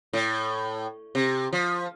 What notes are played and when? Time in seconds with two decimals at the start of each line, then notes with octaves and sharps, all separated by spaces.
0.13 A2
1.15 C3
1.53 F3